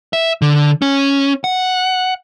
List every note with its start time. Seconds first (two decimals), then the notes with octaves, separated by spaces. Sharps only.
0.13 E5
0.42 D3
0.82 C#4
1.44 F#5